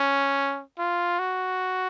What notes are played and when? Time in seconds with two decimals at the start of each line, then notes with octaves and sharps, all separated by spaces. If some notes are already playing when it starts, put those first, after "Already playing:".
Already playing: C#4
0.78 F4
1.19 F#4